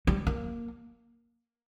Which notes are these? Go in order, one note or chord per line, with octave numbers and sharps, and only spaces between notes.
G3
A#3